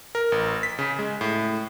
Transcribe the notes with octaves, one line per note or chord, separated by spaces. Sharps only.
A#4
A1
B6
C#3
G#3
A2